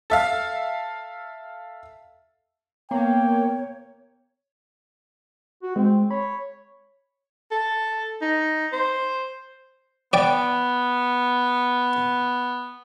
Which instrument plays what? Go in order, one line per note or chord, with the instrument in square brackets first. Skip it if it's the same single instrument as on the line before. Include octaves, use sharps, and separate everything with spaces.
[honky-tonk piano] A4 E5 F5
[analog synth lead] A#3 [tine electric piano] B3 [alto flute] C#5 [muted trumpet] G5
[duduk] F#4
[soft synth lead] G#3 [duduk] C4
[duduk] C#5 [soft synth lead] B5
[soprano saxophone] A4
D#4
C5
[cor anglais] B3 [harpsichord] D5 G5